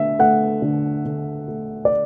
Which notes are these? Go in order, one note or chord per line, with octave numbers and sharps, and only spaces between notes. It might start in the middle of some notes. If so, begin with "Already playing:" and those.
Already playing: D3 A3 E5
A3 F#5
D3
D3
A3
D5